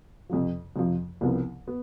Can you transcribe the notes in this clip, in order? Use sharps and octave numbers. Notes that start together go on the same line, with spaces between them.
F2 C3 F3
F2 C3 F3
C2 C3 F3 B3
B3